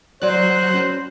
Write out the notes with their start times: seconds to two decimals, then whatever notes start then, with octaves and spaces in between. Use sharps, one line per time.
0.22 F#3 C5 D5 F#6
0.73 C#4 F#4 B4